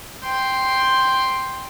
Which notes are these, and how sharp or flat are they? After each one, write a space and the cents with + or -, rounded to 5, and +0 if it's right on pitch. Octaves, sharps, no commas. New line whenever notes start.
G5 +0 C6 +0